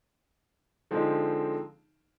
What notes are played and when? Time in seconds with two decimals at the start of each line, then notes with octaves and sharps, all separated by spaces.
0.91 D3 F3 G#3 C4 D#4